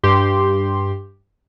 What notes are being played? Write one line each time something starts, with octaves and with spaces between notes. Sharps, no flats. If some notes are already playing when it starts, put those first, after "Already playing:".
G2 G4 C6